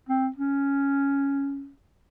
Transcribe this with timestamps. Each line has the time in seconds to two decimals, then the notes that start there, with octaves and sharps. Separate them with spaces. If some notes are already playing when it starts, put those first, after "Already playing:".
0.09 C4
0.36 C#4